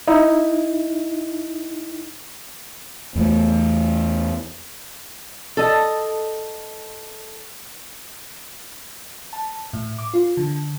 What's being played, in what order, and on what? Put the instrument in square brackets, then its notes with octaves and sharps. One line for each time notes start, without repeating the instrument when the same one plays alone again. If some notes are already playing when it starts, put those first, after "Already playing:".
[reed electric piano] D#4 E4
[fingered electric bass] E2 A3
[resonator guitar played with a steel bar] A4 D#5
[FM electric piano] A5
A2
D6
F4
D3